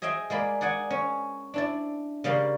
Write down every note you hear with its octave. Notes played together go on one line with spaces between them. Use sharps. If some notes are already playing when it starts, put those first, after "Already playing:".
G#4 D#5 E5 G5 C6
G#3 A#3 D5 B5
G#4 D5 F#5 G#5
C#4
D4 E4 D5
C#3 G3 A#3 F5 C6